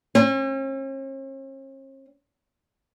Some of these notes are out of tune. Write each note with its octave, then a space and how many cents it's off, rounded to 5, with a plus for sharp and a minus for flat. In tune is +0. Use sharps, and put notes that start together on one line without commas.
C#4 -45